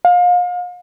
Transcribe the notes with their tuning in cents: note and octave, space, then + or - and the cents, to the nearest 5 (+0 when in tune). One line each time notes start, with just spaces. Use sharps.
F5 +35